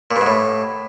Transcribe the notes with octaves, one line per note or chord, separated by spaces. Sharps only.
A#2
G2
G#2
A2